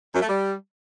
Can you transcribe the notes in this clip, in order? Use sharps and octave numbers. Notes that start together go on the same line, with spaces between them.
F#2
A3
G3